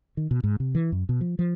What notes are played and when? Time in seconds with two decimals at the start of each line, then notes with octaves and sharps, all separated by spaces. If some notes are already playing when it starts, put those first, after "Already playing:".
0.17 D#3
0.31 B2
0.44 G#2
0.60 C3
0.75 E3
0.92 F#2
1.09 B2
1.21 F3
1.39 F3